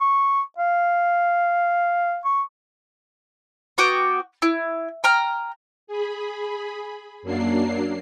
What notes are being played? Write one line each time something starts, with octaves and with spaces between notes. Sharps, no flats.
C#6
F5
C#6
B3 F#4 G5 D6
E4
G5 A#5 F6
G#4 B5
F#2 F#3 A#3 D4 C7